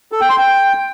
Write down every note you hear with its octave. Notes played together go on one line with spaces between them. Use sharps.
A4
G5
C6
G5